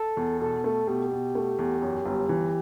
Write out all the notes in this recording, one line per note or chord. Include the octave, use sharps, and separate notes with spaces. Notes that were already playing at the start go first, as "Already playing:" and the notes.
Already playing: A4
E2
B2 A4
A3
B2 G4
B2
A3
E2
F#2
G1
E3